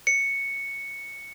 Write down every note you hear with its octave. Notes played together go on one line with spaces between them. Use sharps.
C#7